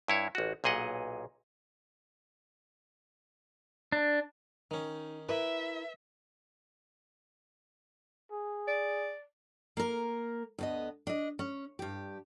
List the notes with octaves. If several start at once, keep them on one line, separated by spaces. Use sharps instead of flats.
G2 E4 C#5
A1 F#4
B1 A#2 G#4 D#5 F#5
D4
D#3 C#4 D#4
E4 A#4 B4 E5
G#4
D5
A#3 A#4
D2 B3 D#5
D4 D#5
C#4
G2 G4